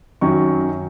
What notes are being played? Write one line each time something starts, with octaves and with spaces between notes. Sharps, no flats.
F#2 D#3 F#3 C#6